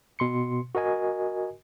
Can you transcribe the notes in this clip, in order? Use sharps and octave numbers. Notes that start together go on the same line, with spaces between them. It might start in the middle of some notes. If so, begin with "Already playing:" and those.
B2 C6 C#7
F#4 A#4 D#5 G#5